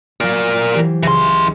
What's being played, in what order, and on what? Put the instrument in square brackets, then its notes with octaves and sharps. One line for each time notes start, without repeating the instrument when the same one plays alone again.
[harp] F#3 F4 [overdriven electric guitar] A#4 D5
[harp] E3 G4 C5
[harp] C#2 G#4 F6 [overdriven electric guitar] E3 C6